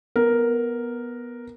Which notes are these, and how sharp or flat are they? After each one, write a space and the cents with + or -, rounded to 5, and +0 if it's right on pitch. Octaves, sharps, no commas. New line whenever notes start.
B3 -10 A#4 +0